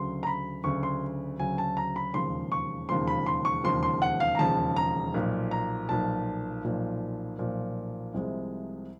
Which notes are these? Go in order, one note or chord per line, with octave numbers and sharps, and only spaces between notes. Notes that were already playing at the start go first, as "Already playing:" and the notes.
Already playing: D2 C#3 F#3 C6
A#5
B5
D2 C#3 F#3 C#6
C6
D2 C#3 F#3 G#5
A5
A#5
B5
E1 D#2 C#3 F3 C6
C#6
E1 D#2 C#3 F3 C6
B5
C6
C#6
E1 D#2 C#3 F3 C6
C6
F#5
F5
A#5
E1 D#2 C#3 F3 A5
A#5
B1 A#2 F3
A#5
B1 A#2 F3 A5
B1 A#2 F3
B1 A#2 F3
C2 C3 F3 G#3